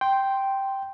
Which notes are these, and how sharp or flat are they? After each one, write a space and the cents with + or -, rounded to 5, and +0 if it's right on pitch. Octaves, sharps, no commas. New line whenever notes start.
G5 -5 C6 +0